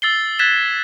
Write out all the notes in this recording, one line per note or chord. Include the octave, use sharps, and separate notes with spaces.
E6 A6 C7 G7
F#6 G#6 A6 B6 E7